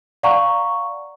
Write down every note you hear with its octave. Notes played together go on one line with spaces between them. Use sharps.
D5 F5 F#5 G#5 A#5 C#6